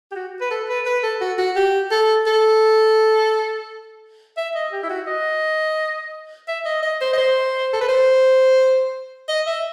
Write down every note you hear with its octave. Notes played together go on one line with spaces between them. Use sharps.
G4
F#4
B4
A4
B4
B4
A4
F#4
F#4
G4
A4
A4
E5
D#5
G4
E4
F#4
D#5
E5
D#5
D#5
C5
D#5
C5
A4
B4
C5
D#5
E5